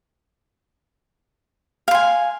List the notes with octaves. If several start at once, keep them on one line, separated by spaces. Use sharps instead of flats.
F5 G#5 C6